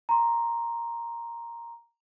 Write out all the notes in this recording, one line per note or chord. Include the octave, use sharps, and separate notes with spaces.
A#5 C6